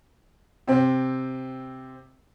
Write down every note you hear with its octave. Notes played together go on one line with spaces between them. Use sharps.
C3 C4